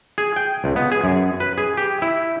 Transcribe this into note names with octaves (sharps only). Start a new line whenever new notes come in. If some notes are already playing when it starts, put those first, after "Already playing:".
G#4
G5
C#2
B3
G#4
F#2
B4
G#4
G4
E4